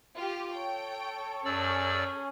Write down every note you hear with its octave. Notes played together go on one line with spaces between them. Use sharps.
F4 G4
A4 C#5 G5
F#2 C#4 G#4 D5 E6